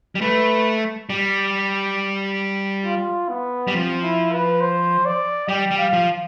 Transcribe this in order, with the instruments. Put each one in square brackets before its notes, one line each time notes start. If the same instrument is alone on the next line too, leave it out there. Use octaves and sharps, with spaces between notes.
[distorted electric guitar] G3
[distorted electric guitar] A3 [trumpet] B4
[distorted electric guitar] G3
[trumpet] F4
B3
[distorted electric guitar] G3
[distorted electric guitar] F3 [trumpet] C4
[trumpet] E4
B4
C5
D5
[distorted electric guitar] G3 [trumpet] G5
[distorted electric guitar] G3
[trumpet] F5
[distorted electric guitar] F3